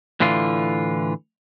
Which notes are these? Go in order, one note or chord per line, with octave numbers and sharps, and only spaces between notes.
A2 D3 E3 F4